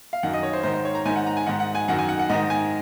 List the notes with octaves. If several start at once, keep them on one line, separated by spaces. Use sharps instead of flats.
F5
F#2 D#3 F#5
D#5
C#5
C5
G#2 D#3 C5
C5
C#5
A#5
G#2 D#3 G#5
F#5
A#5
G#5
G#2 D#3 F#5
F#5
G#5
F#2 D#3 F#5
G#5
F#5
F#5
G#2 D#3 D#5
G#5